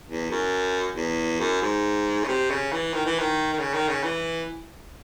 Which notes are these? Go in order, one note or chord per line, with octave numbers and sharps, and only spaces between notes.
E2
F#2
E2
F#2
G#2
C#3
C3
C#3
E3
D#3
E3
D#3
D#3
C#3
D#3
C#3
E3